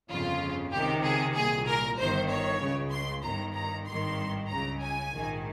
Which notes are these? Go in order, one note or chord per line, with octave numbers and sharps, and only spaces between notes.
G1 F2 C#3 F4
C#2 C3 D#3 G4
G#4
C2 A#2 G#4
A#4
G1 G2 D#3 C5
C#5
C#2 C#3
C6
G1 G2 D#3 A#5
A#5
G#1 G2 D#3 C6
C#2 C#3 A#5
G#5
A#1 G#2 D#3